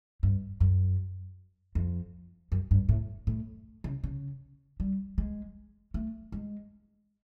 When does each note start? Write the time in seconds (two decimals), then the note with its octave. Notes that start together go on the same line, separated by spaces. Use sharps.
0.23 G2
0.60 F#2
1.75 F2
2.52 F#2
2.71 G2
2.89 A2
3.27 A2
3.84 C#3
4.04 C#3
4.80 G3
5.18 G#3
5.94 A3
6.32 G#3